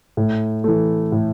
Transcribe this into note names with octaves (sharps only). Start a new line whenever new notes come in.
A2
E3 A3
A2